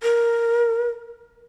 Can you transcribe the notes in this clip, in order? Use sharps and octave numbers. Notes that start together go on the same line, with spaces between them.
A#4